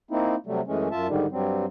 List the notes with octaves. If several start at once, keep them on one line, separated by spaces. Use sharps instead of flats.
A#3 C4 D#4 E4
C3 F#3 G3 A3
F#2 E3 G#3 A3 C#4
F#2 F4 E5 A5
G#2 D3 D#3 G3
G2 F#3 G3 C4